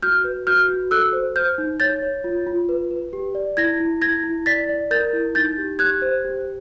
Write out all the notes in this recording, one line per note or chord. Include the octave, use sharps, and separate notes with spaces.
F#4 F6 G6
B4
F#4 F6 G6
F#4
A4 E6 F#6
C5
C5 F6 G6
D#4
C#5 G6 A6
C#5
F4
F4
B4
B4
G4
D5
E4 G#6 A#6
E4
E4 G#6 A#6
E4
D5 A6 B6
D5
A#4 G6 A6
E4
D#4 G6 A6
G4
G4 F#6 G#6
C5
G4